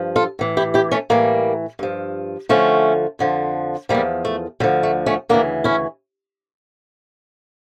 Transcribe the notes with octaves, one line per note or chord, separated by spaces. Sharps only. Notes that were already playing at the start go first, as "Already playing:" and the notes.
Already playing: G2 F3
F4 A4
A2 E3
E4 G4
E4 G4
A3 C#4
A2 E3 G3 A#3
G2 F3
D2 D3 F3 A3 C#4
F2 D3 F3
D3 F3 G3 A#3
E2
A3
D2 D3 F3 G3
A3
A3 C#4
D2 C#3 E3 A#3 D4
C#4 E4